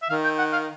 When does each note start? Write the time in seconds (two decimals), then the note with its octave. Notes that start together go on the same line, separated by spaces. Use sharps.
0.03 E5
0.10 D#3 F5
0.24 G5
0.39 F#5
0.53 F5